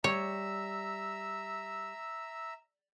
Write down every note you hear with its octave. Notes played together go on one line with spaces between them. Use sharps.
G3 C#5 E5 A#5 E6